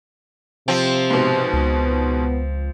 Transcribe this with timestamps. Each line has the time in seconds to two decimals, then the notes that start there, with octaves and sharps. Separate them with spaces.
0.68 C3 F3 C4
1.10 G#2 B2
1.53 C#2
1.84 B3